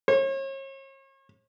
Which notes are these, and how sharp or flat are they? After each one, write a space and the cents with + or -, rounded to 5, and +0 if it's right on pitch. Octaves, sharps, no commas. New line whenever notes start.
C#5 -40